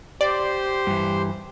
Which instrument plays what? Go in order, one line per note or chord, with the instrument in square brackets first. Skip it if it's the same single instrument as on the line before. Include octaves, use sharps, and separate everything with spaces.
[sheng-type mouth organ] G4 C5 C6 [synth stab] D5
[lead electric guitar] G2 E3